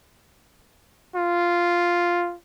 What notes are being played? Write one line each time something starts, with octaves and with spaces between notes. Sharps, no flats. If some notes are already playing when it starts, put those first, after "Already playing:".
F4